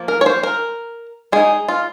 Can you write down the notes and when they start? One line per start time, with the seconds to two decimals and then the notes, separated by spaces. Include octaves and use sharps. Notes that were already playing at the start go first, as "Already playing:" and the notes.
Already playing: F3 A#3
0.08 A#4
0.21 C#5
0.26 C5
0.43 A#4
1.32 G#3 D#4 G#4
1.69 F4